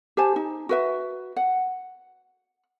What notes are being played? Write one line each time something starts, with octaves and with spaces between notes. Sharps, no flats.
G4 C5 G#5 A5
D#4
F#4 B4 E5
F#5